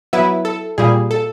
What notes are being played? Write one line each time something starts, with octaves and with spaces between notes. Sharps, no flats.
F#3 B3 E4 B4
A4
A#2 G3 A#3 G#4
A4